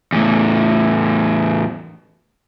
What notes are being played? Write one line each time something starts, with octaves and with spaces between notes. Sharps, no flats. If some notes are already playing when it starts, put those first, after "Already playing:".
E2 A2